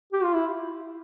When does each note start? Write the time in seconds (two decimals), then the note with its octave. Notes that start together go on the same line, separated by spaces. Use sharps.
0.12 G4
0.23 F4
0.34 E4